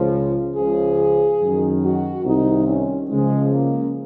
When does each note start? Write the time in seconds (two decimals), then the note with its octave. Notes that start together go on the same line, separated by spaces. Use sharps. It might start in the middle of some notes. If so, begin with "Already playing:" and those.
Already playing: C#2 C#3 F3
0.57 C#2 C#3 F3 G#4
1.41 F#2 D#3
1.83 F#4
2.25 C2 C3 D#3 D#4
2.67 C#4
3.09 C#2 C#3 F3 G#3
3.52 A#3